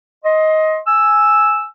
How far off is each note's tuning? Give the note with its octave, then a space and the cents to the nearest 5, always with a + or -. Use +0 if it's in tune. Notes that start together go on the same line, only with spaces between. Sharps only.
D#5 +15 C6 +15
G#5 +5 E6 +0